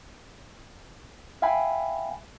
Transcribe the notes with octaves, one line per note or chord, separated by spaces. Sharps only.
E5 F5 G5 G#5 B5